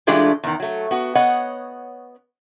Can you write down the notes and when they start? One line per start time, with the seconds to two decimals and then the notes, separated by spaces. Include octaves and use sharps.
0.07 E3 G#3 A3 D4 F4 G4
0.43 E2 D#3
0.60 F#3 A3
0.91 B3 F#4
1.15 B3 C#5 D#5 F#5